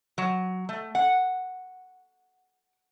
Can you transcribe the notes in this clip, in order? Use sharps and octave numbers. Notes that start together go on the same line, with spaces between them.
F#3
A3
F#5